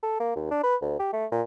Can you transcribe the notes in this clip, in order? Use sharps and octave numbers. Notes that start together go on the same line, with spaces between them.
A4
A#3
D#2
D4
B4
D2
G4
A3
A#2